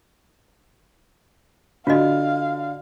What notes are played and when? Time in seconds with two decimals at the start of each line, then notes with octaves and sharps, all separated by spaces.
1.87 D3 F4 F#4 D#5 F5